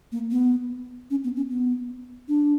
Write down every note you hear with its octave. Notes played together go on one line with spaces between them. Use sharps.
A#3
B3
C#4
B3
C#4
B3
D4